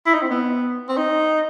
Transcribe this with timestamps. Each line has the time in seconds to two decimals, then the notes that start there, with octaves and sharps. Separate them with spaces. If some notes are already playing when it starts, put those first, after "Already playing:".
0.06 E4
0.14 D#4
0.23 C4
0.30 B3
0.89 C4
0.97 D#4